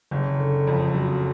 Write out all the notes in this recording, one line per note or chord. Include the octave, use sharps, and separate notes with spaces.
F#1
D3
F2
F#3